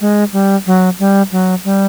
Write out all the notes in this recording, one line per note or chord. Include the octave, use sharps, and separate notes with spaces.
G#3
G3
F#3
G3
F#3
G3